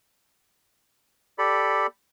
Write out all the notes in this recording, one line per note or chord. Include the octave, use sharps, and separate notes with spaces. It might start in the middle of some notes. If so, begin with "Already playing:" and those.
G4 A4 D5 B5